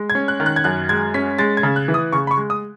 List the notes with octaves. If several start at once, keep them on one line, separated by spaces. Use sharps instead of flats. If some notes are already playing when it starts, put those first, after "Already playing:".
Already playing: G#3
G#6
C#4
F#6
D#3
F#6
G#6
F#2 F#6
G#3 G#6
C#4 B6
G#3 A6
G#6
C#3
F#6
E3
D#6
C#3 C#6
B5
C#6
G#3
D#6